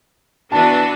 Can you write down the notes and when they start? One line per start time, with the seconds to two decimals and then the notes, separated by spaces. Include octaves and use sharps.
0.52 E3 B3 D4 F#4 B4 A5